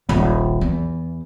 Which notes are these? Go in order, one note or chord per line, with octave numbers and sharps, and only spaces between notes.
D#1 A#1
E2